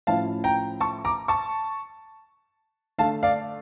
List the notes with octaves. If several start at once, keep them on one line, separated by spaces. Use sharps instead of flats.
A2 F3 C#4 E4 F5 A5
G5 A#5
A5 C#6
A#5 D6
A5 C#6
D3 A3 D4 F5 A5
D5 F5